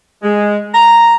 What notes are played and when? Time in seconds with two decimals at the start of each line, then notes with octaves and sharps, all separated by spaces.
0.22 G#3
0.74 A#5